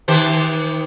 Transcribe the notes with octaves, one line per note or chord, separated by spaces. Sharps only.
D#3 G4 C5